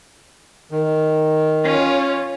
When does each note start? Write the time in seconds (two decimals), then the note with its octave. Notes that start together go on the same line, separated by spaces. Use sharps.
0.71 D#3
1.63 C#4 F4 C#5